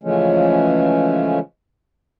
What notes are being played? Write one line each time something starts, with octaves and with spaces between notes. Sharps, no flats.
C#3 E3 F3 G#3 A3 C#4